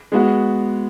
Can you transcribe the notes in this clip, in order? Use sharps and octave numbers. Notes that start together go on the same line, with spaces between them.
G#3 B3 F#4